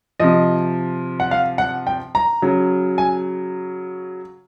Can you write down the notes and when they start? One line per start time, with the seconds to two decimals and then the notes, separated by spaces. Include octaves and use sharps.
0.20 C3 F3 D#5
1.20 F#5
1.31 F5
1.58 F#5
1.87 G5
2.15 A#5
2.42 C#3 F#3
2.98 G#5